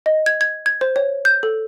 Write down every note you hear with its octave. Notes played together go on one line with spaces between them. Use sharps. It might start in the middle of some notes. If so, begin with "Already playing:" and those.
D#5
G#6
G#6
G#6
C5
C#5
G6
A4